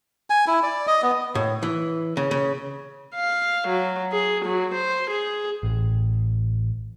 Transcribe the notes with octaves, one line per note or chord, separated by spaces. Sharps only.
G#5
E4
D5
D#5
B3
A2
E3
C#3
C#3
F5
F#3
G#4
F#3
C5
G#4
A1